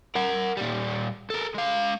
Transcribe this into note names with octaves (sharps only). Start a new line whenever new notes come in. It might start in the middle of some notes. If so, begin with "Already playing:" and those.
A#4 F#5
A#2 G3
A4 A#4
G#3 F5